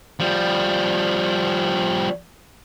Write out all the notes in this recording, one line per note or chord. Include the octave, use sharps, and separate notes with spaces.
F3 G3